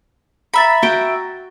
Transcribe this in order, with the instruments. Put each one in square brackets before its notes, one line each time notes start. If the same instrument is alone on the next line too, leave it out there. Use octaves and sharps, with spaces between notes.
[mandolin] E5 B5 [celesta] A#5 A6
[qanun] F#4 G5